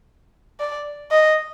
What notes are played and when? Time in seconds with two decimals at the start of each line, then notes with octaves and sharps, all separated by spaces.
0.60 D5
1.11 D#5